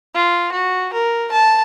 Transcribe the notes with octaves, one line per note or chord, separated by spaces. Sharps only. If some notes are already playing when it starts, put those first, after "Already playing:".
F4
F#4
A#4
A5